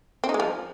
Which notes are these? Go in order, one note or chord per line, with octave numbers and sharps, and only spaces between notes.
C4
D#4
G#3
F3